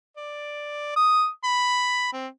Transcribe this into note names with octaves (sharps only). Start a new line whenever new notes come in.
D5
D#6
B5
C4